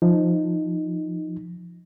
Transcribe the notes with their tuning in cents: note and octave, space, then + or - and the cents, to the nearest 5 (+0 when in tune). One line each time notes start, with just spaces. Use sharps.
F3 +0 D#4 +0